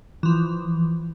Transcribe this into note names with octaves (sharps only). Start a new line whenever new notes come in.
E3 F3